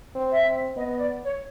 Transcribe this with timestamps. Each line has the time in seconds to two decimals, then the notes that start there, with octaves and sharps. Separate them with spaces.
0.15 C4
0.31 E5
0.46 C4
0.76 B3 D#5
0.99 D5
1.23 C#5